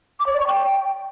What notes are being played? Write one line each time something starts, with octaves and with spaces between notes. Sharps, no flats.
D6
C#5
D5
C#6
G5